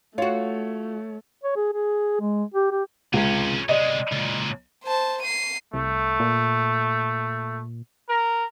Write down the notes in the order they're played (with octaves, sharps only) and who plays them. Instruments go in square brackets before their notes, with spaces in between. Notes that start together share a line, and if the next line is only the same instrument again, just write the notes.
[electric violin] A3 [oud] F4 F#4 [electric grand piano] C#5
[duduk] C#5
G#4
G#4
G#3
G4
G4
[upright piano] C#2 [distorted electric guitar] C3 C#4
[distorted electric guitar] C3 G#3 [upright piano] D5 D#5
[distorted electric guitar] C#2 A#2
[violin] C5 A5
C7 D#7
[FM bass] C2 [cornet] A3
[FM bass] A#2
[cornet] A#4